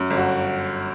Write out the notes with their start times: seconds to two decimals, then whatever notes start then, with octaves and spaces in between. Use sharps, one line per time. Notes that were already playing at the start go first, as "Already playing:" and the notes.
Already playing: F#2
0.10 G1
0.17 F#4